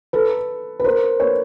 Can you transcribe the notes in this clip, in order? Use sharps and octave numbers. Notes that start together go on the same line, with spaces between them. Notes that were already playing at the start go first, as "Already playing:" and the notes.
A4 B4
B4
A#4 C5
B4 C#5